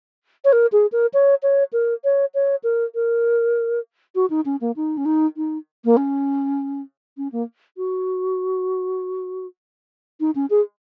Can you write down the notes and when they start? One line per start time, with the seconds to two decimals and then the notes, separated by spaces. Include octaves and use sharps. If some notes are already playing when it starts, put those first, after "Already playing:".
0.45 C#5
0.53 A#4
0.72 G#4
0.92 A#4
1.14 C#5
1.43 C#5
1.73 A#4
2.04 C#5
2.35 C#5
2.64 A#4
2.95 A#4
4.15 F#4
4.30 D#4
4.45 C#4
4.61 A#3
4.76 D#4
4.97 C#4
5.05 D#4
5.37 D#4
5.85 A#3
5.97 C#4
7.17 C#4
7.32 A#3
7.77 F#4
10.20 D#4
10.35 C#4
10.50 G#4